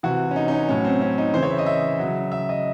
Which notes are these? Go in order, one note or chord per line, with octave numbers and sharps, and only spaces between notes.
C3 E3 F#4
C#4
D#4
D#4
C#4
A2 F#3 C#4
C4
C#4
D#4
C#3 E3 C5
C#5
E5
D#5
E5
C#3 F#3
E5
D#5